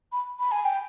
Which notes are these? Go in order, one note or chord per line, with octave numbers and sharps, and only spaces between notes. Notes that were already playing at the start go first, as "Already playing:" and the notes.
B5
B5
G#5
G5